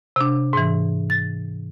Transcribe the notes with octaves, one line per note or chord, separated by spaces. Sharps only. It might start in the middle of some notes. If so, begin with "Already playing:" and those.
C3 D4
G#2 E3
A6